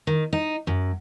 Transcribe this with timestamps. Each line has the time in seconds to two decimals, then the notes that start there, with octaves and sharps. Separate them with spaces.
0.07 D#3
0.33 D#4
0.67 F#2